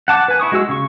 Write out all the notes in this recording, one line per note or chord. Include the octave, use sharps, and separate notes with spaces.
F#5 A5 D6
B4 G#5
E4 C#6 D#6
G#3 F#4 E6
C#3 C#6